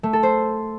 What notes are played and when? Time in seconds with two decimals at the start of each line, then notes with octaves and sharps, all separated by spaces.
0.03 A3
0.13 A4
0.23 C5